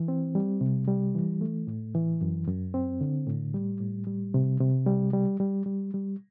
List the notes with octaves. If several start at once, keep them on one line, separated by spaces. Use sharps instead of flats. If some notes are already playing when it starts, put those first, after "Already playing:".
Already playing: E3
C4
G3
C3
G3
E3
A3
A2
E3
F#2
F#2
C4
D3
A2
G3
A2
G3
C3
C3
G3
G3
G3
G3
G3